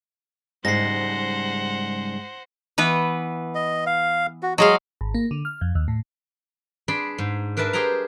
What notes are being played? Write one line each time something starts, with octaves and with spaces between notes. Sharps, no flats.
C#2 G#2 G3 G#3 C5 F#5 A#6 C7
E3 B3 B4
D#5
F5
F#4
F#3 G#3 D#5 F5
G#1
A#3
D3
F6
F2
D#2
A2
D4 G#4 D5 B5 C6
G#2
D4 A#4 B4 E5 A5 B5
G4 G#4 C5 G5 A#5